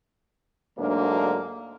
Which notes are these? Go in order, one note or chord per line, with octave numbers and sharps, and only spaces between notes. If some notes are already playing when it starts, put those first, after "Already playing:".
D2 G#2 F#3 A#3 D4